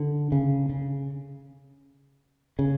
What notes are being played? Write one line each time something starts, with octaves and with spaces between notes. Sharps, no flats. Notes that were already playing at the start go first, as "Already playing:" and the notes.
Already playing: D3
C#3
C#3
C#3